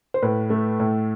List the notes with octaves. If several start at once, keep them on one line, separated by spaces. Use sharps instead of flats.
C5
A2 B4
A3
A2